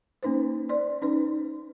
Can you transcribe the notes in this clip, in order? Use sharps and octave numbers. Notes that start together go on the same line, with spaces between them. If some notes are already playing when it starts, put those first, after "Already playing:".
A#3 C#4 D#4 B4 C5
C5 D5 C6
C#4 D#4 B4